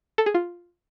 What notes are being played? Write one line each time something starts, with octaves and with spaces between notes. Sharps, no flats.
A4
G#4
F4